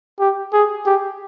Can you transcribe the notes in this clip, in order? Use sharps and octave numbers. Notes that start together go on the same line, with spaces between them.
G4
G#4
G4